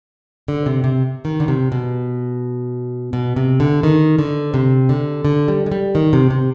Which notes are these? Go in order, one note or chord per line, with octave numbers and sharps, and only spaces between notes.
D3
C3
C3
D#3
D3
C3
B2
B2
C3
D3
D#3
D3
C3
D3
D3
G3
G#3
G3
D#3
C3
C3